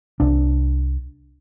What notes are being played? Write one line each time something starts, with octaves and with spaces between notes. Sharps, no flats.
C2 D4